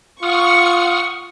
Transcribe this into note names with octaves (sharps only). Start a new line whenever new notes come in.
F4 F#5 C#6 D#6 F6